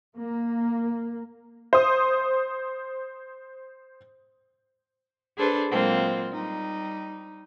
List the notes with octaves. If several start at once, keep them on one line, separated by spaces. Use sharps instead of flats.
A#3
C5 D#6
D4 G#4 A4 B4 C5
A#2 F#3 G#3 A#3 C4 F4
G3 D#4